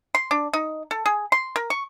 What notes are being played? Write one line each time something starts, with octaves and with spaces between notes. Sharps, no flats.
C6
D4
D#4
A4
G#4
C6
A#4
C#6